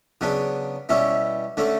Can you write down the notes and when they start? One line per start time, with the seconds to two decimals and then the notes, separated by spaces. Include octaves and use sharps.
0.21 C#3 F#3 B3 D4
0.89 B2 G3 C#4 E4
1.57 D3 A3 C#4